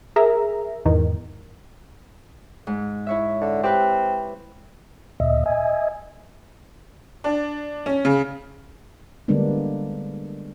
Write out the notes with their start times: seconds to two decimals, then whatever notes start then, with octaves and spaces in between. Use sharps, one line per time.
0.16 G#4 A#4 E5 A#5
0.85 E2 G#2 D#3
2.67 G#2
3.07 E4 C#5 E5
3.41 D3
3.63 C4 G4 B4
5.20 D2 A#2 D#5 E5
5.46 D#5 E5 G#5
7.24 D4
7.86 C#4
8.05 C#3
9.28 D3 G3 G#3 A#3 B3 D4